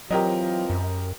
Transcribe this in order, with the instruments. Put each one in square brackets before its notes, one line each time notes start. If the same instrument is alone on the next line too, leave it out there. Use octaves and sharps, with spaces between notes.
[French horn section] E3 C4 F4 [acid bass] F#3 [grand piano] G4 A#4 D#5
[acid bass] F#2